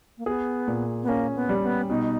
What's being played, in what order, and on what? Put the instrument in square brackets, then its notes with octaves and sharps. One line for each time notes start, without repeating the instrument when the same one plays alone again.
[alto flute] A#3
[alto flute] B3 [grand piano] G#4
[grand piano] A#2
[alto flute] B3
[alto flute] A#3 [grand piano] C#4
[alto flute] B3
[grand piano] G3
[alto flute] B3
[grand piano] B2 [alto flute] D#4